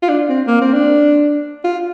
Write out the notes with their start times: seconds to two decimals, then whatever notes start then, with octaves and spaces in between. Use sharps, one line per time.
0.03 F4
0.09 D4
0.29 C4
0.47 A#3
0.61 C4
0.73 D4
1.64 F4